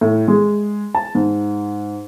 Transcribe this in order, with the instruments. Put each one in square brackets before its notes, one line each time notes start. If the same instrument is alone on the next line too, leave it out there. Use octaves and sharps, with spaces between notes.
[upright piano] A2
G#3
A5
G#2